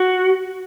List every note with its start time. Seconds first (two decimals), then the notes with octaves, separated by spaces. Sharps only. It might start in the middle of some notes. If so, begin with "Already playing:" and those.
Already playing: F#4